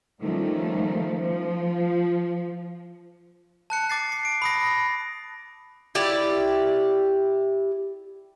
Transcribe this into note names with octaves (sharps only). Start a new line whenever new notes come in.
D#3 F3 G3 A3 C#4
F3
A5 F#6 C#7
D6 A6 C7
C7
D7
B5 D#6 A#6
E4 G4 D5